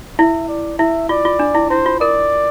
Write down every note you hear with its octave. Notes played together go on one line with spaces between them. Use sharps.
E4 E5
D5
E4 E5
F4 D5
F4
D4
E4
E4 C5
F4
A#4 D5